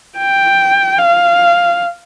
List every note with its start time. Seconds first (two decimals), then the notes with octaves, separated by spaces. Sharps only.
0.17 G5
0.98 F5